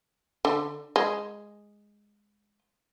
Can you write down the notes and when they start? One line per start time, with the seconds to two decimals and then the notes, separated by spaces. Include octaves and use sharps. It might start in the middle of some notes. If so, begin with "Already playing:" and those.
0.45 D3
0.96 G#3